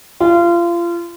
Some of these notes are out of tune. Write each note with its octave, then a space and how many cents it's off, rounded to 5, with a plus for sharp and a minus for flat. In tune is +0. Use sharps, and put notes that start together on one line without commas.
F4 -30